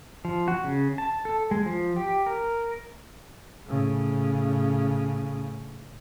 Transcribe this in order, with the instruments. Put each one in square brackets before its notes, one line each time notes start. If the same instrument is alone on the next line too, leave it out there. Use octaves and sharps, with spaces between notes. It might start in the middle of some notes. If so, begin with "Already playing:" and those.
[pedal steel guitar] F3
F#4
C#3
A5
A4
G#3
F3
G4
A#4
[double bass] A2 C#3